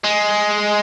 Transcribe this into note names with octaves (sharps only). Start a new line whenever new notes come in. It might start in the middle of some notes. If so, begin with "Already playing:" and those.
G#3